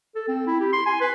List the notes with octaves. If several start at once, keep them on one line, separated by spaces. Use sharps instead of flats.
A4
C4
E4
G4
C6
G#5
B4